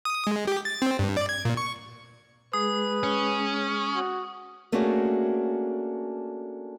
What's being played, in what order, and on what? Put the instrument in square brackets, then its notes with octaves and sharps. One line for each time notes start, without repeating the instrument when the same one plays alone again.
[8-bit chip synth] D#6
G#3
G4
A6
C4
G2
D5
G#6
A#2
C#6
[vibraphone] G#3 G#4 [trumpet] B4 [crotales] D#6
[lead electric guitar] C#4
[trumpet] F#4
[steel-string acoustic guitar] A3 A#3 C#4 D4 F#4 G#4